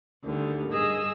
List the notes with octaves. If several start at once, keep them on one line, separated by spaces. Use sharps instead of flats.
D2 D3 D#3 G3
G2 G#4 D#5 E6